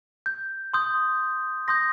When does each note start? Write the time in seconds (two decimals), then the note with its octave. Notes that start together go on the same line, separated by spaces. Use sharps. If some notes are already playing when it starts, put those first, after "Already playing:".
0.26 G6
0.73 C6 D#6 G6
1.68 C6 D#6 G6 A#6